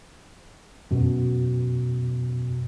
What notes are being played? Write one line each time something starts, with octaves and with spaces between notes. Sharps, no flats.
F#2 B2